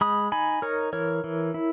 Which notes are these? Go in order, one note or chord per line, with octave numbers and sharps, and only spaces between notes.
G#3 B5 D#6
D#4 G#5 B5
D#4 A#4 C#5
E3 A#4 C#5
E3
E4